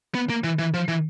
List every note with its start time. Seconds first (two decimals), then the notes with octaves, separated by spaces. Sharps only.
0.15 B3
0.30 A#3
0.44 E3
0.59 E3
0.74 F3
0.88 E3